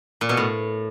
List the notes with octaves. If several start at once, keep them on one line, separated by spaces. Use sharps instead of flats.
A#2
B2
A2